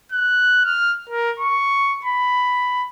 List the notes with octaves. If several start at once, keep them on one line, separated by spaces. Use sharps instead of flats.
F#6
F6
A#4
C#6
B5